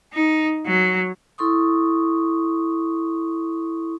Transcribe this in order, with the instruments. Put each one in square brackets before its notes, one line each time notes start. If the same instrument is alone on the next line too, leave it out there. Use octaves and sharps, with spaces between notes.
[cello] D#4
F#3
[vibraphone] E4 A4 C6 C#6 D#6